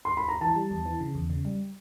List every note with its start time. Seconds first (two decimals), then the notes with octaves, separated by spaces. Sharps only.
0.05 C6
0.17 B5
0.28 A#5
0.41 E3 A5
0.56 G3
0.71 E2
0.85 E3
1.00 C#3
1.15 E2
1.30 C#3
1.45 G3